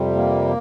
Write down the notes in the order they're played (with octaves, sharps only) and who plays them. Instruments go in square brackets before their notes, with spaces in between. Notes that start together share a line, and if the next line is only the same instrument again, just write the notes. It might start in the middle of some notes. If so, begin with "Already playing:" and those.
Already playing: [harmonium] F2 C3 G3
A#3